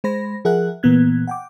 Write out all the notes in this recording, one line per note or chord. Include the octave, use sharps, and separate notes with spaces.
G#3 C5 B5 A#6
F3 G#4 A#4 E5 F#5 F#6
A#2 E3 A#3 B3 F#6 G#6
F#5 G5 D6